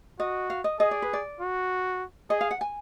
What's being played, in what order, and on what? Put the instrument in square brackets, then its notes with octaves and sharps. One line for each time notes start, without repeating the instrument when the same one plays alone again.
[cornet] F#4 [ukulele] D#5
[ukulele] F5
D#5
[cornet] G#4 [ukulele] D#5
[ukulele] D5
B4
D5
[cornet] F#4
[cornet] G#4 [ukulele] D#5
[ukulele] F5
F#5
G#5